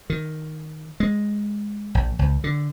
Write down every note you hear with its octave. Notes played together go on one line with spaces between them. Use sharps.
D#3
G#3
A#1
C#2
D3